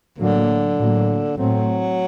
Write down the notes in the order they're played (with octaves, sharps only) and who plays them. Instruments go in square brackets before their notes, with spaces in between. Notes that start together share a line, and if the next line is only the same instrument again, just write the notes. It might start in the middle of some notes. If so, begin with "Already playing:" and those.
[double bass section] A2 F#3 A#3 [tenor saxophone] D3
[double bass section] A2 F#3 A#3
[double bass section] A2 A3 C4 [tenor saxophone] F#3